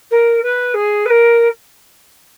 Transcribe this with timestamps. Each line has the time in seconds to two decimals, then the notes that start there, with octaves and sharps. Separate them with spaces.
0.10 A#4
0.42 B4
0.74 G#4
1.05 B4
1.09 A#4